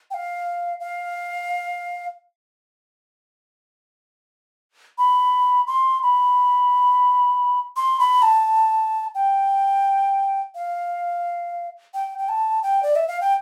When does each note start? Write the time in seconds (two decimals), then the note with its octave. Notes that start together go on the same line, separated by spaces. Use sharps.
0.11 G5
0.14 F5
0.80 F5
4.98 B5
5.67 C6
6.03 B5
7.77 C6
8.00 B5
8.22 A5
9.15 G5
10.55 F5
11.94 G5
12.18 G5
12.29 A5
12.63 G5
12.83 D5
12.96 E5
13.08 F5
13.21 G5